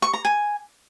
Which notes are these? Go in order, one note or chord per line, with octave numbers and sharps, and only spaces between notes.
C#6
A#5
G#5